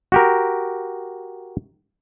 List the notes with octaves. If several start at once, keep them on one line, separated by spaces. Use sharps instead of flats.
F#4 G4 A#4